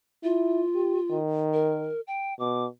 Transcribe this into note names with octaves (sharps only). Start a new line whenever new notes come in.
E4 F4
G4
D#3
A#4
G5
B2 D6